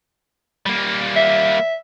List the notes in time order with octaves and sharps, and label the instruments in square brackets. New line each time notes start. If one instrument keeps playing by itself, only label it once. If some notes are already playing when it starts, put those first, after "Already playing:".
[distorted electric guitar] G3 A#3
[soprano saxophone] E5